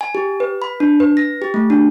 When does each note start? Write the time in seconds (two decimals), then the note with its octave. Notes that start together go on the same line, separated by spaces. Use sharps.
0.01 G#5
0.15 G4
0.40 B4
0.62 B5
0.80 D4
1.00 B4
1.17 A#6
1.42 G4
1.54 A3
1.70 D4